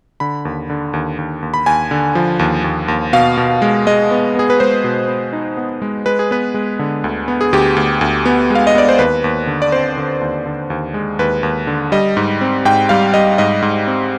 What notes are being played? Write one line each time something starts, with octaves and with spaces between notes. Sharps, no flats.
D3 B5
D#2
D3
D#2
D#2
D#2
B5
D#2 G#5
D3
F3
D#2
D#2
D#2
B2 F5
B2
G#3
G#3 D#5
B3
B3 G#4
B4
G#3 C5
B2
B3
D#4
B3
G#3
G#3 B4
G#4
B3 B4
G#3
D3
D2
B3
G#4
D2 G4
D2
D2
B3
G#3
F5
D#5
B3 D5
C5
D#2 B4
D#2
D3
D5
C4 C5
D3
D#2
D3
D#2
G#3
D#2 B4
D#2
D3
G3 D#5
G#2
C4
G#2 G5
G3 F5
G3 D#5
G#2 D#5
G#2
C4